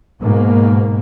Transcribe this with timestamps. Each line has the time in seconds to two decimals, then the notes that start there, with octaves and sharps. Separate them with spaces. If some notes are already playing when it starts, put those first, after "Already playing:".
0.21 G#2 B2 A#3